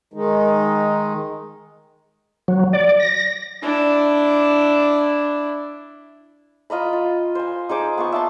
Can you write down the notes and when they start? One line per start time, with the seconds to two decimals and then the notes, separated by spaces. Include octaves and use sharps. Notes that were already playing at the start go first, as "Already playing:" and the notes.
0.14 D#3 G#3 D#4
2.48 F#3
2.73 D5
3.00 A#6
3.63 D4 E4
6.70 F4 D#5 A#5 B5
6.93 F4
7.35 C5 G#5
7.69 D#4 G#4 C5 D6
7.97 B3 F4 C#6
8.12 E5 A5 C6